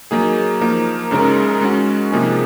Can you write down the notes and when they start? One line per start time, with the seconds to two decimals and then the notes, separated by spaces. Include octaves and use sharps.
0.11 F#3 A#3 D#4 G#4
0.61 F3 A#3 D#4 A#4
1.11 F#2 C#3 G#3 D#4 A#4
1.61 G#3 C#4 F#4
2.12 C3 F3 A#3 D#4 G#4